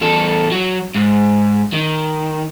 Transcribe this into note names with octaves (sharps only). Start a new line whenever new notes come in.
E2 A4
F#3
G#2
D#3